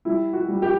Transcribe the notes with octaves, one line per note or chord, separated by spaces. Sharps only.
G3 E4
F#4
G3
G4